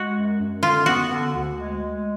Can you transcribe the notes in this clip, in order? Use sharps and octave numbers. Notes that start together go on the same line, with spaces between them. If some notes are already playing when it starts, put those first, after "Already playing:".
Already playing: G#3 F#4
F#2
F#2
D3 F4
B3 F#4
D3
D2
G#3
G#3